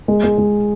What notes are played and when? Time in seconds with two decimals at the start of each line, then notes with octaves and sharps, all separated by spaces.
0.08 G#3
0.24 G#3
0.38 G#3